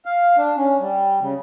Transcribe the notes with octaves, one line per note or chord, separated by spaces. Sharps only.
F5
D4
C#4
G3
C#3